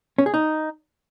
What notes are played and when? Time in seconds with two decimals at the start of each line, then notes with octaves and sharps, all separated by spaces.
0.18 C#4
0.26 G#4
0.34 D#4